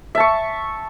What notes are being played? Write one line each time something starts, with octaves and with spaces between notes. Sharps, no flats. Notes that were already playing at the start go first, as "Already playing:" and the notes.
E5 A5 C#6